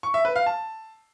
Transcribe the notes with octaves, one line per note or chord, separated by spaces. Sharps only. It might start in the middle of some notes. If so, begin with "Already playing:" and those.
C#6
E5
B4
F5
A5